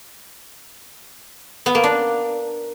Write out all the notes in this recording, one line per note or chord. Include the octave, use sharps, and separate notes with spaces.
B3
A#3
D4